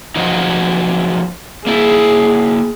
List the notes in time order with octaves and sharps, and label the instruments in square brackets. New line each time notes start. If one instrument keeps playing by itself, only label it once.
[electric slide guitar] F3 F#3 D#4
[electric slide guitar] A#3 E4 [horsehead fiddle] G#4